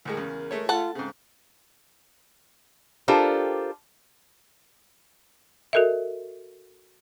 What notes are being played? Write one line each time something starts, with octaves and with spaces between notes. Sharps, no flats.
D2 A2 G#3 A#4
E2 C#3
G#3 A3 C#5
F4 A4 F#5 A5
G#2 C#3 C4
D4 F4 G4 A4 A#4 C5
F#4 A4 A#4 D#5 E5